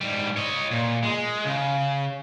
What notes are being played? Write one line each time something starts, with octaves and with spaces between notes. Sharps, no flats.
G#2 G3
C#5 D#5
A#2
G#3
C#3